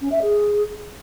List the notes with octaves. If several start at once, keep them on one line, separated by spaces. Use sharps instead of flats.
C#4
E5
G#4